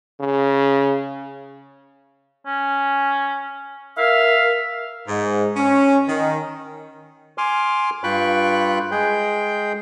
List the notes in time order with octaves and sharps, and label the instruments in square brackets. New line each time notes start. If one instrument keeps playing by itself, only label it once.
[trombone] C#3
[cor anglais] C#4
[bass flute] A#4 [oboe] E5 [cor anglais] F5
[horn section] G#2
C#4
D#3
[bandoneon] G#5 C6 D6 F6
G2 F4 G5 B5 C#6 F#6
G#3 G#4 G5 G6